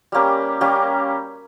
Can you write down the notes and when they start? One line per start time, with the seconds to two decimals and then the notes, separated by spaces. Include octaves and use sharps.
0.12 G3 A#3 C#4 G4
0.61 G3 A#3 C#4 G4